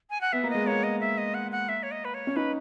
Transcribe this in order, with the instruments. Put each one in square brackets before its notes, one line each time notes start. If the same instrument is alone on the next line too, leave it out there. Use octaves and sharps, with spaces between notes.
[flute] G#5
F#5
[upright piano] B3 [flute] E5
[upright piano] A#3
[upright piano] G#3 [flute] D#5
[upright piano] A#3 [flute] C#5
[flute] D#5
E5
D#5
F#5
F#5
E5
C#5
D#5
B4
C#5
[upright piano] C#4
[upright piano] D#4 [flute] B4